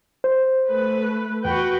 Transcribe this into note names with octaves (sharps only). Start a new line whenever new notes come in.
C5
A3 B4
E2 F#4 B4 G5